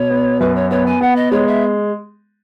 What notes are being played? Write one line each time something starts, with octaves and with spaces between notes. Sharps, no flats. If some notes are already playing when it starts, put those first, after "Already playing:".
Already playing: B2 C#5
B3
F#2 B4
C#5
B3 C#5
G#5
B3 F#5
D#5
G#3 C#5
E5